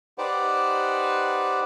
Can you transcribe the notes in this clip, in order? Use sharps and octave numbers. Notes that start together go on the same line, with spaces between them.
D#4 G4 B4 C5 D5 F#5